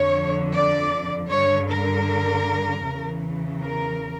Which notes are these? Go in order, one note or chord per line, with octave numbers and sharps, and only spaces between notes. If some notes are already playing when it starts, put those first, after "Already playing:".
Already playing: F2 D3 C#5
D5
G2 D3 C#5
A#4
E2 C#3 E3
A#4